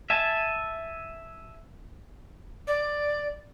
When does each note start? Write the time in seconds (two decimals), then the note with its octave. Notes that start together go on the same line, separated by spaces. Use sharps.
0.10 E5 G#5 A5
2.67 D5